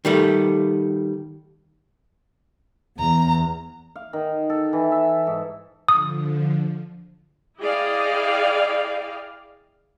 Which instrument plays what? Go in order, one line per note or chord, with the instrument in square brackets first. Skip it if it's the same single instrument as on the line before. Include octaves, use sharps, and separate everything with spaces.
[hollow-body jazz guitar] D#3 G3 A3
[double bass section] E2 [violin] A#5
[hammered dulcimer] F5
D#3
A4
E3
E5
G#2
[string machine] D3 F3 [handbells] D#6
[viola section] E4 G#4 D5 D#5 F5 G5